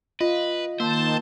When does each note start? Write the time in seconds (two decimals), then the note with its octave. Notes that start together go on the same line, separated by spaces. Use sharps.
0.21 F4 B4 D#5
0.80 D#3 A#3 C5 A5